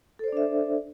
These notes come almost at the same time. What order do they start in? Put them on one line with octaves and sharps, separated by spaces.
A4 C5 D5 D4 E5